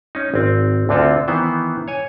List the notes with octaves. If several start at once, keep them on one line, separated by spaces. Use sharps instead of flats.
C#4 D#4
G#1 C4
D2 D3 C4 F4 A4
D#3 E3 B3 C5
C#5 G#5